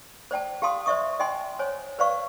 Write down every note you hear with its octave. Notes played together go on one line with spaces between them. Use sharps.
C5 D5 G5 A5
G4 F5 A5 C6 D#6
C5 D5 E5 C#6 D#6
D#5 G5 G#5 C6
C5 C#5 G#5
B4 C5 D5 F5 C#6